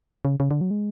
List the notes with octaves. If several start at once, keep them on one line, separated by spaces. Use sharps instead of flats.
C#3
C#3
D3
F#3
G#3